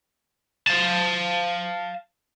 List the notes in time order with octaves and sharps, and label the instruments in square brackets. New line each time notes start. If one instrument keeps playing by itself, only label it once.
[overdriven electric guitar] F5 A5